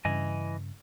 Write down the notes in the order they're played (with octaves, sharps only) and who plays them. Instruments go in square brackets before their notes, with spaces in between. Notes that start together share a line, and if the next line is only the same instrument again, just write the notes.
[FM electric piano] G2 C#3 [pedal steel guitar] E3 D#5 G#5